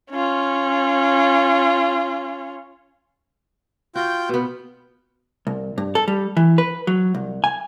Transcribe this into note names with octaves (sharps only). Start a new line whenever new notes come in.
C#4 F4
F4 F#4 G5 G6
B2 B3
C2
G2
A4
G3
E3
B4
F#3
C2
G#5